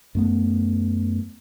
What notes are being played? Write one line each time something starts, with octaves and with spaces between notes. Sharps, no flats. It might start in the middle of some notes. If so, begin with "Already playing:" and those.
F#2 A3 B3